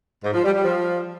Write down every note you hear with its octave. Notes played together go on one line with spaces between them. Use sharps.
G#2
F3
G3
G3
F3